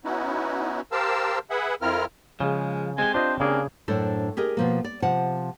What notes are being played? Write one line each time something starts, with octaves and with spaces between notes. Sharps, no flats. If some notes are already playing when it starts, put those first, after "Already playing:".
B3 C#4 D#4 E4 F#4
G4 A#4 C5 F5 A5 E6
G#4 B4 E5 F#5
F2 C4 E4 F4 A#4 F6
C#3 F3 G#3
G#3 C4 G4 G#5
D4 F4 C5 D#5
C#3 A#3 D4 G#4
F#2 A2 D4 A4 C5
G4 G#4 A#4 D#5
B2 F3 A#3
D5
C3 F3 F4 F#5 A5